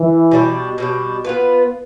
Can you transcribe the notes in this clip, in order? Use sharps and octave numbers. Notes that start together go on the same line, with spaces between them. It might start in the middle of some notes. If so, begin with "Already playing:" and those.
Already playing: E3
B2 G3 D4
B2 G3 D4
B3 F4 B4